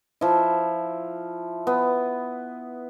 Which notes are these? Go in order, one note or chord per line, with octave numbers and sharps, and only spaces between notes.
F3 E4
B3